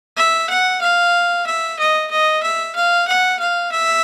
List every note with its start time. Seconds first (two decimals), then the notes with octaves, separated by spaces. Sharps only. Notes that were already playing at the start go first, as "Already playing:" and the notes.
0.17 E5
0.50 F#5
0.81 F5
1.46 E5
1.79 D#5
2.11 D#5
2.43 E5
2.75 F5
3.08 F#5
3.39 F5
3.72 E5